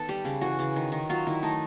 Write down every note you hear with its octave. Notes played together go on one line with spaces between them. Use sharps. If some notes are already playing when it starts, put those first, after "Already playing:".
Already playing: D#3 B3 A4
G3 G4
C#3
E3 F#4
C#3
D#3
D#3
F#3 F4
D#3 E4
A3 D#4